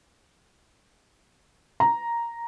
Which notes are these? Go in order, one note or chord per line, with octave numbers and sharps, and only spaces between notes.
A#5